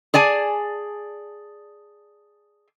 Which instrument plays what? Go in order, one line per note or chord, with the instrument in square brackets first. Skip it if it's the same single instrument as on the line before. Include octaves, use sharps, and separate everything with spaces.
[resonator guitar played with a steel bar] G#4 D5 G#5 A5